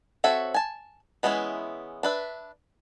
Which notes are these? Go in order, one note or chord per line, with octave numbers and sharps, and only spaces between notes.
C4 F#4 A4 C#5 E5
G#5 A5
E3 G#3 B3 C#4 E4
D4 B4 E5